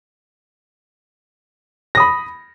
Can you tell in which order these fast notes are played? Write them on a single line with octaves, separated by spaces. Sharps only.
A#6 D#6 B5